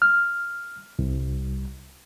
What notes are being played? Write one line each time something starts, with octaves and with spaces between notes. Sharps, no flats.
F6
C2